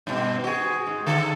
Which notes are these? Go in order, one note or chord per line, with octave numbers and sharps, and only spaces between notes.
G2 B2 C4
F#4 G#4
G#2
D3 A4